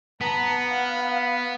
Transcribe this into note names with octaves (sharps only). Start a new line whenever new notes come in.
B3 A5 A#5
F5 F#5